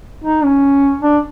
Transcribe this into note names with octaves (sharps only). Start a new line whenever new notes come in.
D#4
C#4
D4